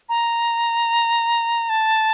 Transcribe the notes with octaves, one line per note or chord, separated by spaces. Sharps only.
A#5
A5